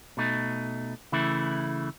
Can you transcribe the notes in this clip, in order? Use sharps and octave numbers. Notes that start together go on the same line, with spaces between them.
B2 A3 D#4
C#3 E3 A3 E4